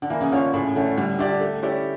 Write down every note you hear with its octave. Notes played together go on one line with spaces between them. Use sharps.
D3
E3 A#3
C#3
D3 C#4 F4 C#5
A2 C#3
D3 E3 A3 C#4
D3 G3
D3 D4 G4 D5
A3
C#4 E4 G4 D5